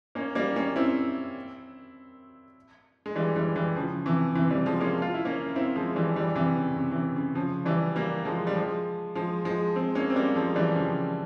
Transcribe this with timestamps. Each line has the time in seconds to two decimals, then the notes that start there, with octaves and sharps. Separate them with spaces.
0.15 A#3 C#4
0.35 G3 A#3
0.56 A#3 C#4
0.76 C4 E4
3.06 G#3
3.15 E3 G3
3.36 E3 G3
3.56 E3 G3
3.76 C#3 F3
4.06 C3 E3
4.35 C3 E3
4.50 E3 G3
4.66 F3 G#3
4.81 A#3 C#4
5.02 F4
5.14 E4
5.25 A#3 C#4
5.56 C4 E4
5.76 F3 G#3
5.96 E3 G3
6.16 E3 G3
6.36 C3 E3
6.56 C#3
6.76 C3
6.92 E3
6.96 C#3
7.16 C#3
7.35 C#3 F3
7.65 E3 G3
7.96 G3 A#3
8.25 F3 G#3
8.47 G3
8.55 F3 G#3
9.15 F3 G#3
9.45 F3 G#3
9.76 G#3 C4
9.95 A#3 C#4
10.10 C4
10.16 G3 A#3
10.35 F3 G#3
10.56 E3 G3
10.75 C#3 F3